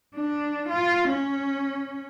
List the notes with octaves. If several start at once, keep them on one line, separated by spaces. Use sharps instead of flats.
D4
F4
C#4